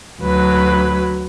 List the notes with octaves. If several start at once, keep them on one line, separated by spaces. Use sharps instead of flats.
D2 F#3 B4